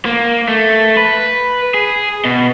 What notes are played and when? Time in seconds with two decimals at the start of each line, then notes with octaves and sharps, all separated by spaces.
0.05 A#3
0.48 A3
0.97 B4
1.74 G#4
2.25 B2